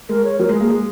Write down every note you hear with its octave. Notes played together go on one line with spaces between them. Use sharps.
G#3 A#4
C#5
F#3 A#4
G#3
G#4
A#3
G#3 G#4